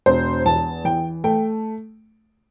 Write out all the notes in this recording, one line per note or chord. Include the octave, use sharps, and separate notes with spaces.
E1 C5
E2 A5
E3 G5
A3 G5